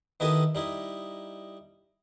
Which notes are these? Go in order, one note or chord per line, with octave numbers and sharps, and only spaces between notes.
D#3 B3 E4 G4 A4 D#5
G3 D#4 E4